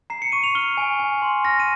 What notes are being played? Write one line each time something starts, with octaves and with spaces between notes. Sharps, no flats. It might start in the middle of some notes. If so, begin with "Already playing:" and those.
A#5 C7
C#7
C#6 D#7
F7
F6 G7
G#5
G#5
C6
F6 A#6
D#7